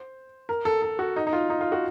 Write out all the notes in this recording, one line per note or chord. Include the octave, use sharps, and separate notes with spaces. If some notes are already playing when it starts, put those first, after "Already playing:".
Already playing: C5
A#4
A4
A4
F#4
D#4
D#4
F4
D#4
F4
F#4